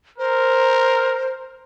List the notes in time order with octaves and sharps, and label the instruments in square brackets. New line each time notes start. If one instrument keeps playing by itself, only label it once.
[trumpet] A#4 [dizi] C5